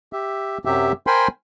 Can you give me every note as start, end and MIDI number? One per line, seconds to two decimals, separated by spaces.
0.13 0.58 67
0.13 0.58 76
0.65 0.92 42
0.65 0.92 48
0.65 0.92 54
0.65 0.92 67
0.65 0.92 76
1.07 1.28 70
1.07 1.28 72
1.07 1.28 79
1.07 1.28 80
1.07 1.28 83
1.07 1.28 84